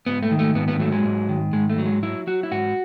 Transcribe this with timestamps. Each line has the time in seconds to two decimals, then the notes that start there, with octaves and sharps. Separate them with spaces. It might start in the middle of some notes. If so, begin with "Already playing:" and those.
0.06 G#2 B3
0.23 A3
0.31 D#3
0.39 A3
0.55 G#2 B3
0.68 B3
0.79 F#3 A3
0.92 G#3
1.05 G#2
1.29 D#3
1.53 G#2 G#3
1.70 A3
1.78 F#3
1.86 G#3
2.03 F#3 E4
2.27 F#3 F#4
2.43 E4
2.51 G#2 F#4